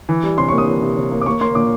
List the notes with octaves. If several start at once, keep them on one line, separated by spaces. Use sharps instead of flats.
E3
G3
C3 C6
A#3 C#6
D#6
E3
C3
C3
A#3
D6
A#3 C#6
A#3 C6
A#2 D6